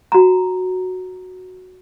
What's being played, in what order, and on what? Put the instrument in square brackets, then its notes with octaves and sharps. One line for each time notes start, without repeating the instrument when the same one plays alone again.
[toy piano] F#4 A#5